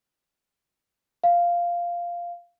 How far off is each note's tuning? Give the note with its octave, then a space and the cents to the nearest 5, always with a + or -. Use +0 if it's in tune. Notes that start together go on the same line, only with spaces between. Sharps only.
F5 -5